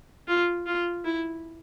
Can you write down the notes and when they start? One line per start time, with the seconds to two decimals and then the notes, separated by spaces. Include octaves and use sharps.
0.28 F4
0.66 F4
1.05 E4